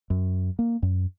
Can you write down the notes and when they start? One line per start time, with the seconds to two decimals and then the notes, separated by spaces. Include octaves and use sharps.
0.10 F#2
0.59 A#3
0.83 F#2